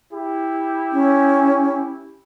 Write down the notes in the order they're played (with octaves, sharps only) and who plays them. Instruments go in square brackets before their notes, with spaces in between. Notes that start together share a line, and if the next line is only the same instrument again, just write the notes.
[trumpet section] E4 G4
[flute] C#4